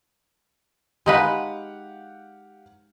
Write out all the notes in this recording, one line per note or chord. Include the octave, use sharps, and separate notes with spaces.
G#3 D#4 G4 B4 F5 F#5